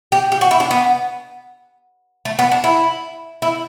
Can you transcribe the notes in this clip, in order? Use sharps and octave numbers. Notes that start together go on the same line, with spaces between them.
G4
G4
F#4
E4
D4
B3
A3
B3
D4
E4
E4